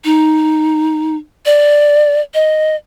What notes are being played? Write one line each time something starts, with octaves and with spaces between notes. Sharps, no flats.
D#4
D5
D#5